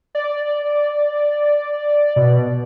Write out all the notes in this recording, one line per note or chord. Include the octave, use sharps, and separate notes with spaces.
D5
B2